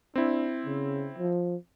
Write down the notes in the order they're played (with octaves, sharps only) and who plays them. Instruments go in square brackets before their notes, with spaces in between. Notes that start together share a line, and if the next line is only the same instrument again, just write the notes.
[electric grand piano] C4 E4 [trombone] D4
[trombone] C#3
F3